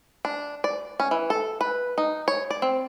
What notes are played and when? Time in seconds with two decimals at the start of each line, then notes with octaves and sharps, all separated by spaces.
0.25 D4
0.64 D5
1.00 C#4
1.11 E3
1.30 A4
1.61 B4
1.98 D#4
2.28 C#5
2.51 D5
2.62 C4